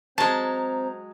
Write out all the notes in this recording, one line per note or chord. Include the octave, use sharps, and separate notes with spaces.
F#3 G#3 C4 C5 A5 A#5